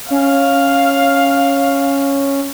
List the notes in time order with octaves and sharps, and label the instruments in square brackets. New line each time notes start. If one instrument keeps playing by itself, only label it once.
[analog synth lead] C#4 [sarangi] F5